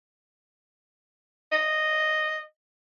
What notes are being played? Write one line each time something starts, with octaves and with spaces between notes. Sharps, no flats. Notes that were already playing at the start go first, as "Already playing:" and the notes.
D#5